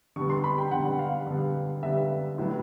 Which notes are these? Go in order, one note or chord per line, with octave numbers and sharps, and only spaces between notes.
D3 G3 B3 C#6
C6
B5
G5
D3 G3 B3 F#5
F5
D3 G3 B3
D3 G3 B3 E5
A2 F#3 B3